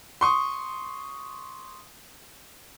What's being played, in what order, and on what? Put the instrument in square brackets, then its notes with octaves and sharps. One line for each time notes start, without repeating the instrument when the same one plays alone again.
[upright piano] C6 C#6 D#6